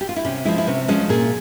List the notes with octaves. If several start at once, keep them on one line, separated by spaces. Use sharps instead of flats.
G4
F4
E4
C3 C#4
F3 G#3 E4
E4
C3 C#4
F3 G#3 C#4
A#2 G#4